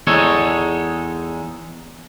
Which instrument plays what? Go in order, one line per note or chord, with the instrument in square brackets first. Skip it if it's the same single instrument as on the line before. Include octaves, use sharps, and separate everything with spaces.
[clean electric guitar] E2 G#3 D#4 A4 C#5